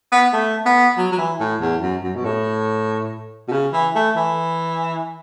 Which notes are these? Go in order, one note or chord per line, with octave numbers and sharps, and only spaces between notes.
B3
A3
B3
F#3
F#3
E3
A2
E2
F#2
F#2
B2
A2
B2
C#3
E3
A3
E3